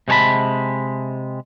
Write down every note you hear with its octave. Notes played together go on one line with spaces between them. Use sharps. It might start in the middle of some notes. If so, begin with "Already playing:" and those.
C3 G#3 C#5 A5 B5